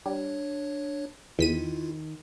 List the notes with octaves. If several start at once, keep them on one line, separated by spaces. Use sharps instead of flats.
G3 D4 C#5
E2 D#3 E4 F4 B6 D#7